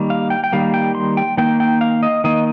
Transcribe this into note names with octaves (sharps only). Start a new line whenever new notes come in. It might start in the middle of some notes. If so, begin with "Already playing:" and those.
Already playing: D#3 G3 A#3
F5
G5
G5
D#3 G3 A#3 F5
G5
C6
G5
D#3 A#3 G5
G5
F5
D#5
D#3 A#3 D#5